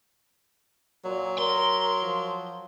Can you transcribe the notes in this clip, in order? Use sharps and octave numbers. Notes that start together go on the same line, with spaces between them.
A#2 F#3
A#4 C6
F3